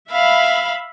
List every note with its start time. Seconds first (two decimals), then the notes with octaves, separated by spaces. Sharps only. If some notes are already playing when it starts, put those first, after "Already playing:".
0.11 E5 F5 B5